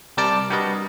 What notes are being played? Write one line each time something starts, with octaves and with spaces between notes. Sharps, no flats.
C3 G3 A#4 D5 A5 D6
G3 D4 F#4 A#4 B4 D#5